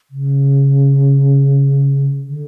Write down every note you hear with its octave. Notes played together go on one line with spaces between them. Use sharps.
C#3
D3